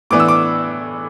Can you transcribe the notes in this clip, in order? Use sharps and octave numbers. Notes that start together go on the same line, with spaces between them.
A2 E3 B3 D4 D6
E6
D6